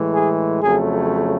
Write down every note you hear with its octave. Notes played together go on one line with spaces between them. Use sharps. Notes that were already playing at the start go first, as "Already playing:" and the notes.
Already playing: A2 E3 G#3
G#4
F2 C#3 F#3 A3 G#4